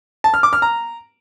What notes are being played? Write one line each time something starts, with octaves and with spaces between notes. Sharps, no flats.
A5
F6
D6
F6
A#5